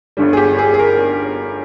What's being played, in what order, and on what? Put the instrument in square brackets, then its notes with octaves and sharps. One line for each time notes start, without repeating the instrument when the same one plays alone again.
[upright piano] G1 G2 D3 G3
G#4
G4
G#4
G#4
A#4